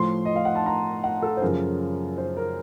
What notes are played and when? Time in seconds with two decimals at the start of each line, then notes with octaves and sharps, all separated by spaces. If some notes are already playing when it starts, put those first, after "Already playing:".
Already playing: A2 F3 C6
0.25 D#5
0.36 F5
0.45 F#5
0.55 A5
0.66 A#5
1.04 F#5
1.22 A4
1.37 C5
1.42 F#2 C#3 F3 A#4
2.18 C5
2.37 A#4